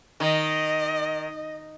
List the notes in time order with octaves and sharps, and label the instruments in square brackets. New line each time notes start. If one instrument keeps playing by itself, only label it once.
[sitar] D#3 [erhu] D#5